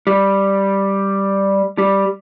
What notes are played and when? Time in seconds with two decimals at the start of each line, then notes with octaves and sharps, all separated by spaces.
0.07 G3
1.78 G3